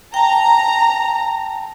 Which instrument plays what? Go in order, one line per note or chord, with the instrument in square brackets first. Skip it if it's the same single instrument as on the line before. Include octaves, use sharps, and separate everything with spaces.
[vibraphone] G5 A5 [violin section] A#5